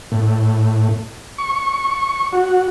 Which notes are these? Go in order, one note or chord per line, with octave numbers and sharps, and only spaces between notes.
A2
C#6
F#4